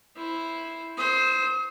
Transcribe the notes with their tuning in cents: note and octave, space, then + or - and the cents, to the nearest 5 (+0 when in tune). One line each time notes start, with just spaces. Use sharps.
E4 +0 C5 +0
C5 +0 D#6 +45